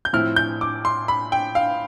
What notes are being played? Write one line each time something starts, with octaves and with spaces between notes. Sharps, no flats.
G6
A2 F3 C4 E4 F6
G6
D6
C6
B5
G5
F5